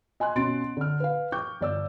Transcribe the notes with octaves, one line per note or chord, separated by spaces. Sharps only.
D#5 G#5 C6 F#6
B2 C#4 C6 A6 D7
D3 F6
B4 F5
G5 C#6 D6 G6
G1 D5 E6